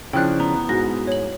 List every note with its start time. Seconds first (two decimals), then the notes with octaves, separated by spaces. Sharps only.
0.13 C#3 F3 D4 E4 G5 F#6
0.40 B3 A#5
0.69 G#2 F#4 A#6
1.07 C#5 F#7